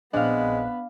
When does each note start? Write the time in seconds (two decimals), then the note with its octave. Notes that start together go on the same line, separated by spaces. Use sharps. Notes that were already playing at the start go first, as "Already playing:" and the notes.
0.13 A#1 G#3 B3 C4 D4 B4 F5 F#6